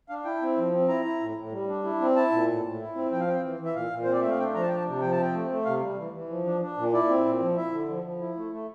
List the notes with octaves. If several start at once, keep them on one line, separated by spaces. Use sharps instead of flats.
D4 F5
E4 G5
C4
F3
C4
E4 A#5
E4
A2
A2
G3
D4
E4
C4
E4 A5
A#2
A2
A2
E4
C4
F3 G5
F5
C4 G5
E3
E3
E5
A#2 F5
A#2
C4 C5
D5
A3 E5
F5
D4 G5
F3 A#5
A5
D4 G5
A5
C3
F3 G5
A5
C4 G5
A3
A3
C3 F5
G3
E3
E3
F3
D4
D4
A#2
E4 D5
C4
A#2
F3
E4 E5
D3
F3
F3
E4
A3
A3